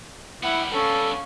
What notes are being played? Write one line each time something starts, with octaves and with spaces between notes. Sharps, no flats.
G3 B3 E4 F#5
C#4 A4 F5